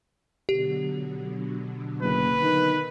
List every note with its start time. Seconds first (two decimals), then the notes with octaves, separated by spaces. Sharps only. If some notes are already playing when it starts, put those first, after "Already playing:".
0.49 B2 D3 F#3 G4
2.02 F#1 B4
2.42 D#3